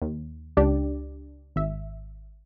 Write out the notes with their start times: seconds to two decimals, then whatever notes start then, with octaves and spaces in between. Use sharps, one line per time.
0.02 D#2
0.57 C#2 D4 G4 D5
1.56 G#1 E5